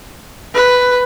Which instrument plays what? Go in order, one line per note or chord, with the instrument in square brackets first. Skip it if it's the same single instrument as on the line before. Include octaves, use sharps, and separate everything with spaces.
[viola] B4